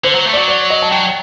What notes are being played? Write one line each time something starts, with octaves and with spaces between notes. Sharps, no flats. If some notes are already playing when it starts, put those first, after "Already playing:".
D3 C5
F#3
A3
F#3 D5
D5
D#5
A5
F#3 G5